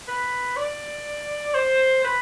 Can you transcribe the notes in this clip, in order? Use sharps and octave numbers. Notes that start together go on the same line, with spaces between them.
B4
D5
C5
B4